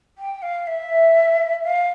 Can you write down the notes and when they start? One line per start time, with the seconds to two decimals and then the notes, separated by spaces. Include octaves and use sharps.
0.18 G5
0.42 F5
0.66 E5
1.63 F5